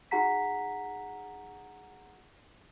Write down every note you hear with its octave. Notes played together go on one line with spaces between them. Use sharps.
D#4 F#4 G#4 F#5 A#5 B6